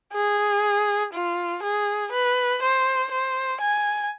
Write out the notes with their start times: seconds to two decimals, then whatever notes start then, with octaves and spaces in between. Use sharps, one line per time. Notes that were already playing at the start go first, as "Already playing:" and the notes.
0.13 G#4
1.14 F4
1.63 G#4
2.12 B4
2.63 C5
3.12 C5
3.61 G#5